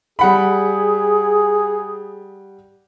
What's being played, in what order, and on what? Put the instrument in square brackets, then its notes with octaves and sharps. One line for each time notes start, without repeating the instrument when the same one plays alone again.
[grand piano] G3 F#5 B5 [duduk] G#4